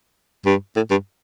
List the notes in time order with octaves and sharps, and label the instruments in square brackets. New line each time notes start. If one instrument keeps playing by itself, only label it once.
[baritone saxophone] G2
A2
G2